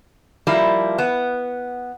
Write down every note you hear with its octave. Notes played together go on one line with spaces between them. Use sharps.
F3 G3 A#3 E4
B3